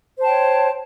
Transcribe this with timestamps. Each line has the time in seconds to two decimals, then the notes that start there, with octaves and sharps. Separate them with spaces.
0.16 C5
0.21 A5
0.25 G5
0.29 C#5